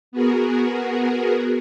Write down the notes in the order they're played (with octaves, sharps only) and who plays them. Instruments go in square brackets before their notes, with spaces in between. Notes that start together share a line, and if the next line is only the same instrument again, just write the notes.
[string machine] B3 F#4 G#4 A#4